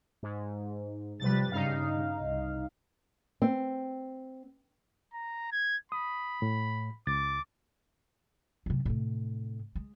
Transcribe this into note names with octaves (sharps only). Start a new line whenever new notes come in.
G#2
C3 F3 G3 B4 A6
G2 C#3 G3 D#4 F5
C2
C4
A#5
G#6
B5 D#6
A2
C#2 D6 A6
F#2 C3
A2 C3
G#3